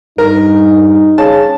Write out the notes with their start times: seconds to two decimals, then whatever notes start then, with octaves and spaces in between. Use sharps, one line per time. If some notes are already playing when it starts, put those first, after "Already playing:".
0.18 G2 D#4 A#4
1.18 C#3 A5